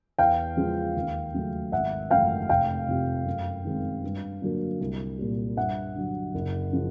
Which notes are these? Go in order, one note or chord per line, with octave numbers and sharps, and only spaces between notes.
E2 F5 G5
C#3 F3 G#3
D#2
C#3 F#3 A3
G#1 E5 F#5
F#2 C#3 E3 A3 F5 G5
F1 F5 G5
F2 C3
F#2
D#3 G#3 C4
G2
D3 F#3 A#3
C2
A#2 G3
G2 E5 F#5
D3 F#3
F#1
C#3 F3